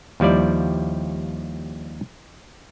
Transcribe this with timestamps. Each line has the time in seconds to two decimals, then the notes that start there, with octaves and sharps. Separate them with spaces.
0.20 D#2 F3 G3 E4 D5